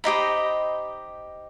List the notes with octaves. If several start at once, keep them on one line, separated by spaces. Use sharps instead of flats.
D#4 G4 C5 D#5 B5